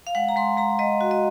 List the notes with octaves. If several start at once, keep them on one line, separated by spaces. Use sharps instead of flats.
F5
G#3 F#5
A#5
G#3 C6
G#3 A#5
G#3 D#5
F#4
D#5